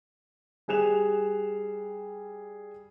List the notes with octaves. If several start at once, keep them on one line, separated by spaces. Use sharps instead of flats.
G3 G#4 F#6 E7 F7